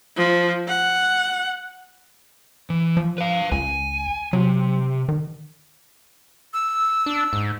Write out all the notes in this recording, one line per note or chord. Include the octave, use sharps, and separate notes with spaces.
F3
F#5
E3
F3
B4 F5
C#2 G#5
C3 F#3
D#3
E6
D4
G#2